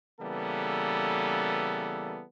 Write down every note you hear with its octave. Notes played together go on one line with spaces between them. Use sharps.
C#3 E3 G3 A#3 B3 A4